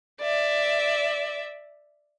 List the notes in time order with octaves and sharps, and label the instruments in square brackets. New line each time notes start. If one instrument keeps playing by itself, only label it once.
[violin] D5 E5